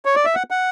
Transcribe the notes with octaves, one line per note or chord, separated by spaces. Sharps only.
C#5
D5
E5
F#5
F#5